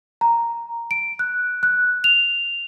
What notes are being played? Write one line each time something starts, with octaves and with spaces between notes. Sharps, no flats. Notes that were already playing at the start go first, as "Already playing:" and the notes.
A#5
D7
F#6
F#6
F7